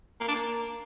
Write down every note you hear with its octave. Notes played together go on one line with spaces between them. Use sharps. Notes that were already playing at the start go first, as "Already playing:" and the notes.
A#3
D4
A#3